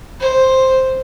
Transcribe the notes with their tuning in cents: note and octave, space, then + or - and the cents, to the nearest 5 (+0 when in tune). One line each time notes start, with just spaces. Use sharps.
C5 +0